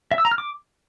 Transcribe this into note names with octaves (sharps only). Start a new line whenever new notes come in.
E5
E6
A#5
F6
D6